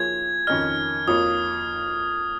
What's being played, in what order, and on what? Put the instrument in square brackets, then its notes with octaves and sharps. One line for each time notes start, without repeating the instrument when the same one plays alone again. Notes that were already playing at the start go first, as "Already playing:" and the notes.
Already playing: [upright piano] F3 A#3 F4 G#4 C#5 [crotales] G#6
[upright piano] F2 D#3 C#4 A#4 D#5 [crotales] F6
[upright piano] F2 F3 A#3 F4 C#5 [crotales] D#6